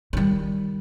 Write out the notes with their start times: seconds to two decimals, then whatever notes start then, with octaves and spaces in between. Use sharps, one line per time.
0.13 D#3 G3